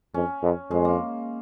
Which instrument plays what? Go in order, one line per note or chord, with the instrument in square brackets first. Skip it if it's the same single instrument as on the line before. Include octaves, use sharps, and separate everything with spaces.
[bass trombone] F2 [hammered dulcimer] C#4
[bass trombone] F2
[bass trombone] F2 [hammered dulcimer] G#3
[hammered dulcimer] A#3